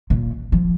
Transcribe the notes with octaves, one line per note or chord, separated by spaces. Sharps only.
A#2
F3